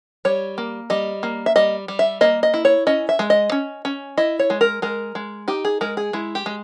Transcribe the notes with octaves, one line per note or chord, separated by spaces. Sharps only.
G3 C#5
A#3
G3 D#5
A#3
E5
G3 D#5
G3
E5
A#3 D#5
D#5
E4
C#5
C#4 D#5
E5
G#3
D#5
C#4
C#4
E4 D#5
C#5
G#3
A#4
G#3 A#4
G#3
D#4 G4
G#4
G#3 A#4
G#4
G#3 E4
G4
G#3